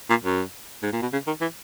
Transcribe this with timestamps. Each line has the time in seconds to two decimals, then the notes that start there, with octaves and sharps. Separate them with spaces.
0.10 A#2
0.24 F#2
0.83 G#2
0.92 A#2
1.02 B2
1.13 C#3
1.27 D#3
1.41 E3